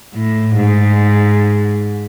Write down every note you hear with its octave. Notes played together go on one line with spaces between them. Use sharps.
A2
G#2